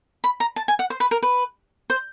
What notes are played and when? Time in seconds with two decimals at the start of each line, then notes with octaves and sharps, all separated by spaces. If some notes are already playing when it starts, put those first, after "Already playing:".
0.24 B5
0.40 A#5
0.56 A5
0.68 G#5
0.79 F#5
0.90 C5
1.00 B4
1.11 A#4
1.23 B4
1.90 C5